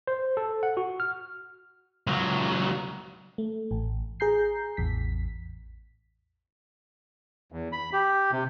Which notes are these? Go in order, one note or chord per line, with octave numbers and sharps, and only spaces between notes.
C5
A4
F#5
F#4
F6
C#2 F#3
A3
A1
G#4 A#5 G6 C7
A1 E2 B6
E2
B5
G4
C3